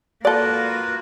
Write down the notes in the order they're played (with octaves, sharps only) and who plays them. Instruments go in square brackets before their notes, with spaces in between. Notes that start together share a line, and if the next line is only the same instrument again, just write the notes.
[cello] A#3 F#4 [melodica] F4 B4 [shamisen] A4 D5